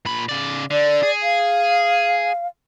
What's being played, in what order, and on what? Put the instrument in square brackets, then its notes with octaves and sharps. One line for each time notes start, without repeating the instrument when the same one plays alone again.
[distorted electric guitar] A#2 B5
C#3 D5
[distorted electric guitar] D3 [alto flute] D5
[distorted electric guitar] G#4
[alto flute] F5